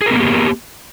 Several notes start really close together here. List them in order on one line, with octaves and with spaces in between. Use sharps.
G#4 A#4 B3 A#3 G4